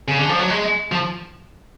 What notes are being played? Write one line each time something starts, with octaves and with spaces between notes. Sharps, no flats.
C#3
D3
F3
F#3
G#3
F3